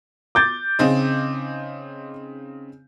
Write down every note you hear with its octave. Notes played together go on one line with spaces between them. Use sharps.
D6 G6 A6
C#3 C4 D#4